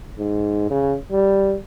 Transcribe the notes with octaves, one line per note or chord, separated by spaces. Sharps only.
G#2
C#3
G3